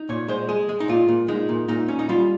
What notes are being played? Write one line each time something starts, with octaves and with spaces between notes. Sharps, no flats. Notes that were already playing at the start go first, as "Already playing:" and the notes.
Already playing: D#4
A#2 C#5
G#3 C5
G#3 G#4
G#3
D#4
A#2 F4
A#2
G#3 D#4
A#2
A#2 D#4
C#4
D#4
G3 F4